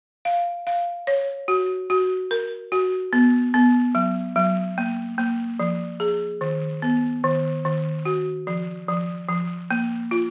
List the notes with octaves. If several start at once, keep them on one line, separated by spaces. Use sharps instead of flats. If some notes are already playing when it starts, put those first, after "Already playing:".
F5
F5
C#5
F#4
F#4
A#4
F#4
B3
B3
F#3
F#3
A#3
A#3
F3
G#4
D#3
B3
D#3
D#3
F#4
F3
F3
F3
A#3
F4